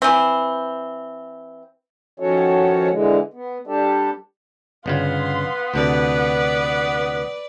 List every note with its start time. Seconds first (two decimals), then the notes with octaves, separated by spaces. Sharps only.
0.02 E3 C4
2.20 D#3 F3 C#4 F#4 A4 C#5
2.91 D3 E3 G#3
3.34 B3
3.67 G3 D4 G4 A4
4.86 G1 C#3 B3 F4 F5 C6
5.74 D2 C3 A4 B4 D5 F#5